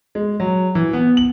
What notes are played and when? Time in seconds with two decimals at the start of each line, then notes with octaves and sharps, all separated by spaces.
0.15 G#3
0.40 F#3
0.75 E3
0.93 B3
1.17 F#7